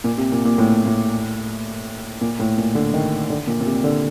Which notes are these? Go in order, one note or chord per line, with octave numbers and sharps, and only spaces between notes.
A#2
C3
A#2
A#2
A2
A2
A#2
A2
A#2
D3
D#3
D3
A#2
A#2
C3
D3